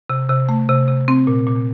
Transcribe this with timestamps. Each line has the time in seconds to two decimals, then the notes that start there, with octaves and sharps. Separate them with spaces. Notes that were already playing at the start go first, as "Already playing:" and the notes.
0.10 C3
0.30 C3
0.49 A3
0.69 C3
0.88 C3
1.08 C4
1.27 A#2
1.47 A#2